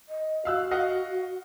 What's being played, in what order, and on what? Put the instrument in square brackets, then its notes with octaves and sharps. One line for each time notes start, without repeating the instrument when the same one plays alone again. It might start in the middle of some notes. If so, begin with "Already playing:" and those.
[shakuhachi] D#5
[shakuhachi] F#4 [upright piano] F5 E6 F#6
[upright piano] D#5 F5 F#5